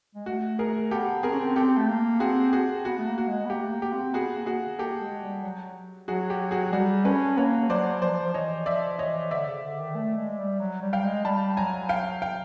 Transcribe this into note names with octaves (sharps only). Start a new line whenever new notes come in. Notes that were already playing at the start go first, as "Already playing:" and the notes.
G#3
A3 F#4
G#4 A#4
B3 G4 A4
C4 G#4 A#4
C#4
C4
C4 G4 A4
A3
A#3
C4 F#4 G#4
F#4 G#4
B3 F#4
A3
A#3
F#4
G#3
B3
A#3 G4
A3
A#3
G4
C4
B3 F#4 G#4
A#3
F#4 G#4
A#3 G4 A4
G#3
G3
F#3
F#3 F#4 G#4
G4
F#4 G#4
G3 F#4 G#4
C#4 A4 B4
A#3 B4 C#5
F#3 C5 D5
F3 C5 D5
F3
E3 C#5 D#5
F3 D5 E5
E3 C#5 D#5
D3 D5 E5
C#3
D3
D#3
A3
G#3
G3
F#3
G3
F5 G5
G#3
G3 A5 B5
F#3 G#5 A#5
F5 G5
F5 G5